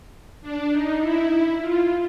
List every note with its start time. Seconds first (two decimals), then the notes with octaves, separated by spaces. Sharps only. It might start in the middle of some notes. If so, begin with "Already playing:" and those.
0.42 D4
0.72 D#4
1.01 E4
1.61 F4